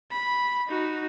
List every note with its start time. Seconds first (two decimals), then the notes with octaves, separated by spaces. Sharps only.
0.11 B5
0.68 D#4 F#4